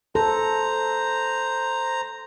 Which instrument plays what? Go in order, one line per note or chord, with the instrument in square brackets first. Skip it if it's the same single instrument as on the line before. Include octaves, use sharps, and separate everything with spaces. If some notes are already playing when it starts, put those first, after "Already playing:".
[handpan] A4 [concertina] C5 A#5